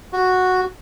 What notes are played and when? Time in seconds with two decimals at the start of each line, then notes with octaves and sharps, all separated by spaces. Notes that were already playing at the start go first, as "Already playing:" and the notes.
0.13 F#4